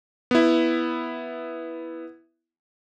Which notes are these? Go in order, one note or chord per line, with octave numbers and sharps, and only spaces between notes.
B3 E4